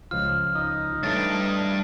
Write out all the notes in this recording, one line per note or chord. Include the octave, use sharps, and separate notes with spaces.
C#2 F3 F4 F6
D#4
G2 E3 A3 D4 C#5 A6